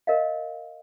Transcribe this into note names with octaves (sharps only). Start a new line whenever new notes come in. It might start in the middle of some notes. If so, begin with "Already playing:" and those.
A#4 D#5 F5